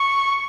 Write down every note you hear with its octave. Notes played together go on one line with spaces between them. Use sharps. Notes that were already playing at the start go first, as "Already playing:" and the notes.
Already playing: C#6